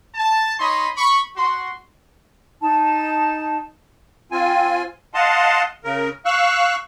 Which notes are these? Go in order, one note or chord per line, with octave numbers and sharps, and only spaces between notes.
A5
D#4 C#5 D#5 B5 C6
B5 C#6
F#4 C6
D#4 A5
C4 F4 G#5
D#5 F5 F#5 A5 C6
C#3 A#4
F5 C#6 E6 F#6